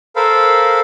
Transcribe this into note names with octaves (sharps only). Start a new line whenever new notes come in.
A4 A#4 C5 F5 B5